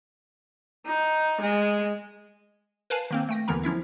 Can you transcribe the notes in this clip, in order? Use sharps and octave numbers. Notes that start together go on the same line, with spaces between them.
D#4
G#3
A#4 B4 F5 G#5 A5
D#3 A#3 C4
A3 G5 A#6
D#2 D3 E3 B3 A#4 A#5
F3 C#4 E4 E5